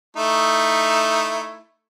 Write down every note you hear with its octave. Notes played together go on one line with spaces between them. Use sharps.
A3 D#4 E4